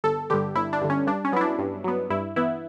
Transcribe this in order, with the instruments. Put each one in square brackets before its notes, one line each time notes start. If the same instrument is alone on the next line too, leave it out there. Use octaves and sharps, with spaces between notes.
[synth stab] G1 A4
G2 D3 G4
G1 E4
D4
G2 D3
C#4
G2 D4
C#4
F#3 B3 E4
D4
G2
F#3 B3
G2 E4
E3 B3 E4